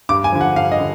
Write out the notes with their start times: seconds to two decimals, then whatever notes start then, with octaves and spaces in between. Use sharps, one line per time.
0.09 G2 D6
0.24 G#5
0.32 D3 F3
0.41 F#5
0.56 G2 F5
0.71 D#5
0.80 D3